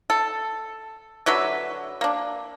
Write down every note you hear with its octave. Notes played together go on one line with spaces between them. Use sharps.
A4
D3 F#3 B4 E5
A#3 D4